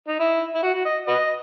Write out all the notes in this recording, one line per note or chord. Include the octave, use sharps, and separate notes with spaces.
D#4
E4
E4
F#4
F#4
D#5
F#4 B4 D#5